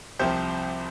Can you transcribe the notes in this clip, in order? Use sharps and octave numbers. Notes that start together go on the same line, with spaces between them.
C2 C3 F3 G4 C5